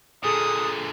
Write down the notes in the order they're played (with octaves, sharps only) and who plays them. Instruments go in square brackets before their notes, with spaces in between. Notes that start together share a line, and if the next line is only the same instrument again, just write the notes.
[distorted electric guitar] A#2 D3 [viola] G#4 A4 [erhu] D#6